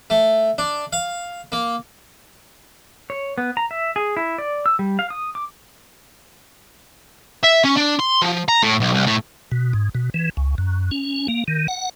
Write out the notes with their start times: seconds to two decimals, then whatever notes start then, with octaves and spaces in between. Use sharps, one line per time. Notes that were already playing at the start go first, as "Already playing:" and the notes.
0.10 A3
0.58 D4
0.93 F5
1.52 A#3
3.10 C#5
3.38 B3
3.57 A#5
3.71 E5
3.96 G#4
4.17 E4
4.38 D5
4.66 E6
4.79 G3
4.99 F5
5.10 D#6
5.35 D6
7.44 E5
7.65 C#4
7.77 D4
8.00 C6
8.22 F3
8.49 A#5
8.63 A2
8.80 B1
8.93 C2
9.07 A2
9.52 B2
9.73 G#2
9.95 B2
10.14 E3
10.37 C#2
10.58 F#2
10.91 C#4
11.28 A#3
11.48 D#3
11.68 F#5